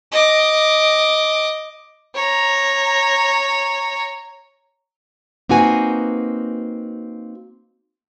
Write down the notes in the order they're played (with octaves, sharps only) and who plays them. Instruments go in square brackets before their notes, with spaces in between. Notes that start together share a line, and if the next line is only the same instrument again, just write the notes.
[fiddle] D#5 D6
[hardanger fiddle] C#5 A#5
[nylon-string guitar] A#3 C4 D#4 F#4 B4 G#5